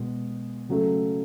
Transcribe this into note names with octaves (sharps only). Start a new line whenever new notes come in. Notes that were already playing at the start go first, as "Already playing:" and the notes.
Already playing: B2 G#3
C#3 F#3 A3